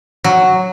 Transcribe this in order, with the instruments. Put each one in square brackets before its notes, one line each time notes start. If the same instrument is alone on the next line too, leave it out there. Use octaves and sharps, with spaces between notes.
[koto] F#3